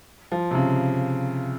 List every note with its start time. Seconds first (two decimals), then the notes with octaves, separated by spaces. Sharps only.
0.32 F3
0.51 C3
0.55 C#3